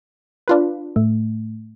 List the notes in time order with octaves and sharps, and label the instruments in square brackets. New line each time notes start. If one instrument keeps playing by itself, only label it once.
[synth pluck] D4 F4 B4
[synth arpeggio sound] A2 A3